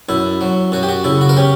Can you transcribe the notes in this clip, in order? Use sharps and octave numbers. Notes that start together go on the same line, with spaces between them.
F#2 E4
F#3
F#2 F#4
G4
F#4
C#3 E4
F#4
A#4
C#4 G4